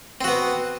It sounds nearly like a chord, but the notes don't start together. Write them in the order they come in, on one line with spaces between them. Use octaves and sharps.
C4 F#4 B3